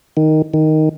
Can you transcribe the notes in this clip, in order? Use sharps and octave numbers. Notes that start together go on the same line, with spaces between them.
D#3
D#3